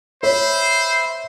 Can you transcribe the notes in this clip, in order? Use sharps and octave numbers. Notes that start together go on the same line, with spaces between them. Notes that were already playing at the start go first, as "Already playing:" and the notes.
C5 C#5 E5 B5